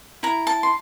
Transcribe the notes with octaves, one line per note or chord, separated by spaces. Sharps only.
E4 A#5
A5
C6